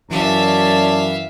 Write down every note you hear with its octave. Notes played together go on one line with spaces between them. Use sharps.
F#2 E3 C#5 D5 E5 F5 A5